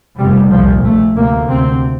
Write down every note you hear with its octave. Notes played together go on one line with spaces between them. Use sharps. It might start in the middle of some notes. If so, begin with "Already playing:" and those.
F1 F2 C3 G3
C2 A#2 F3
A#1 A#2 A3
D2 C3 A#3
D2 C3 C4